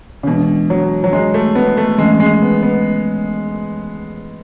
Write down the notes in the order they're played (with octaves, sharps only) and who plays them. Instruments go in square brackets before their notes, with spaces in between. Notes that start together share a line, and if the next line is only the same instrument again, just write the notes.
[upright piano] C#3
[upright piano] B2 [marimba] E3 G#3 D4
[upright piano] F#3
F#3
G#3
A3
B3
A3
[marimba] E3 A3 C#4 G#4 [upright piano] G#3
[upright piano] G#3
B3
B3